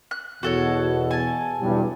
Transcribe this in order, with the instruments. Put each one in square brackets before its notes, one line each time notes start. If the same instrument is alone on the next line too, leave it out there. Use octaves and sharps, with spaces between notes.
[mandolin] F#6
[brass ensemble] E2 B2 [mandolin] F#4 A4 C#5
[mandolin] G#5 A5
[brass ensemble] B1 E2 G2